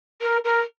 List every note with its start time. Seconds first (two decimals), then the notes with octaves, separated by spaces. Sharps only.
0.21 A#4
0.44 A#4